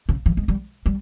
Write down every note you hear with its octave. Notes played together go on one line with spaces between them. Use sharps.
C#3
E3
G#3
G3
G3